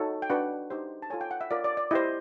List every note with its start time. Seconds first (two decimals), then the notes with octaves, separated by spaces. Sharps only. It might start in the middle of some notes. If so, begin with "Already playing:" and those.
Already playing: D#4 F#4 A4 C#5
0.22 G5
0.30 D4 F#4 B4 F#5
0.70 D#4 G4 C5
1.02 A5
1.10 F4 A4 C#5 G#5
1.21 G5
1.31 F#5
1.41 E5
1.51 F4 A#4 C#5 D5
1.64 D5
1.77 D5
1.91 E4 G4 C5 D#5